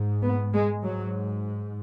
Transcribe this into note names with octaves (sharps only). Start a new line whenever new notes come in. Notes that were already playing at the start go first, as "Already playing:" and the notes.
Already playing: G#2
B3
G#3
G#2 F#3